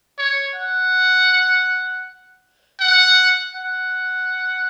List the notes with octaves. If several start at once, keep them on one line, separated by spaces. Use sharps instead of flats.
C#5
F#5
F#5
F#5